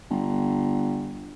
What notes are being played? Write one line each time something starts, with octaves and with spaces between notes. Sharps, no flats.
G1